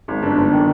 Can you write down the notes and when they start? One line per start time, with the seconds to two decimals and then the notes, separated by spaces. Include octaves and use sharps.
0.08 G#1
0.22 G1 D4
0.37 G1
0.52 D#3